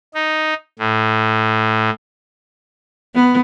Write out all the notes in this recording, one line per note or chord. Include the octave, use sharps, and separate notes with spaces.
D#4
A2
B3